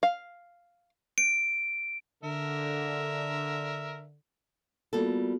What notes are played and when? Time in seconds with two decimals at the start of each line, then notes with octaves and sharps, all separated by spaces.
0.03 F5
1.18 D7
2.24 D3 A#4 E5
4.93 G3 A#3 B3 F4 F#4 A4